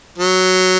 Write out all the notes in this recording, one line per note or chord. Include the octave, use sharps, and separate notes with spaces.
F#3